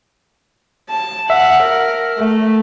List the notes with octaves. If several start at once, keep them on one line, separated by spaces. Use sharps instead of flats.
A5
E5 F#5
A#4
A3